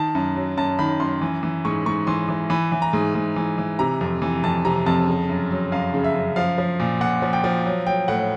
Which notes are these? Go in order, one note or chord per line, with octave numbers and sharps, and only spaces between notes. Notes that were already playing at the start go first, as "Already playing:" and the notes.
Already playing: D#3 A5
F#2
F#3
F#2 A5
D#3 B5
F#2 C6
E3
E3
G#2 C#6
G#2 C#6
E3 C6
E3
E3 B5
E3
A#5
G#2
G#2
E3
E3
C3 A#5
F2
E3
F2 A5
C3 A#5
F2 A5
C#3
F#2
F#3
F#2 F5
C#3
E5
F#2
F3 F5
F3
A#2
A#2 F#5
F3
G5
F3
F#3
F#3 G5
A2 F#5